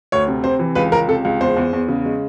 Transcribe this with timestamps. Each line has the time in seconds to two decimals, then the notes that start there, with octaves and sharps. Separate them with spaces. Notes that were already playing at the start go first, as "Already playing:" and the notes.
0.12 D2 C#5
0.28 C3
0.44 C3 C5
0.59 E3
0.75 C#2 B4
0.92 C#2 A#4
1.08 C3 A4
1.25 C#2
1.41 E2 C5
1.56 E2
1.73 E2
1.88 C#3
2.05 G#3